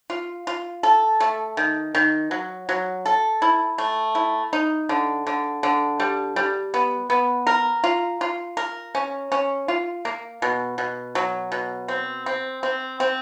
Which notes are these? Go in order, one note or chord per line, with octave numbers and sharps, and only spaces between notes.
F4
F4
A4
A3
D#3
D#3
F#3
F#3
A4
E4
A3
E4
D#4
D3
D3
D3
G3
G3
B3
B3
A#4
F4
F4
A#4
C#4
C#4
F4
A#3
B2
B2
F#3
B2
C4
C4
C4
C4